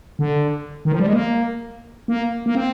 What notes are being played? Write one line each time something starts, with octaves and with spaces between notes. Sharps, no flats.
D3
D#3
F3
G3
G#3
A#3
A#3
A#3
C4